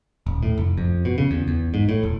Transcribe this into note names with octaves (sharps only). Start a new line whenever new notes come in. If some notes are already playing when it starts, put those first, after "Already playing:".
D#1
A2
F1
F2
B2
C#3
E2
E2
G#2
A2
E1